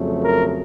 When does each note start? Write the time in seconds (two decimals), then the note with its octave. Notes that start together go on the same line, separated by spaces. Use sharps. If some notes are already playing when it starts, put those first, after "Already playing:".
Already playing: F2 C#3 F#3 A3
0.22 A#4